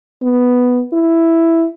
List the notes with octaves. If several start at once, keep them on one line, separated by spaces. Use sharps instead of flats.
B3
E4